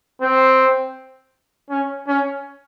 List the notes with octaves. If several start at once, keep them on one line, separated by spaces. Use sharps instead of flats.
C4
C#4
C#4